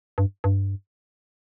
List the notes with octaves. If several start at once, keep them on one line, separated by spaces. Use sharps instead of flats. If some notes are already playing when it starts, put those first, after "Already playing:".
G2
G2